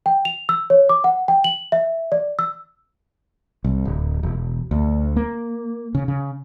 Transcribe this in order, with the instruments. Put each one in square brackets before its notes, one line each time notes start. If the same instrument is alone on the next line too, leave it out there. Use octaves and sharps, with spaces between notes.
[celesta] G5
F7
E6
C#5
D6
F#5
G5
F#7
E5
D5
E6
[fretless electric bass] C2
D1
E1
D2
A#3
C#3
C#3